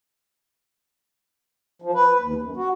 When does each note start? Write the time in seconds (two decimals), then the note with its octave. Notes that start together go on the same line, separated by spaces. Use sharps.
1.82 F3
1.94 B4
2.20 D#2
2.42 F#2
2.57 F#4